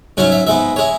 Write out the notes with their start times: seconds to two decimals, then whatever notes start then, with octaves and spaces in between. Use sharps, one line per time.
0.17 G#2 F#3 C#4 E4 C#5
0.32 E5
0.47 G#2 G#3 B3 E5
0.76 G#3 E4 C#5